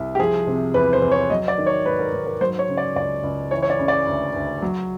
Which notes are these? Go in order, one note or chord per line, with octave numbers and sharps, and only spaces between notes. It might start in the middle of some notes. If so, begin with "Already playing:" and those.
Already playing: C2
G4
F3 G#4
C3
E2 B4
C5
E2
C#5
F#3 D#5
D5
D#3
C#5
G#2 B4
A#4
G#2
A#4
F#3 C5
C#5
C#3
D5
C#2 D5
C#2
E3 C#5
C#5
D5
C#3
D5
D2
D2
F#3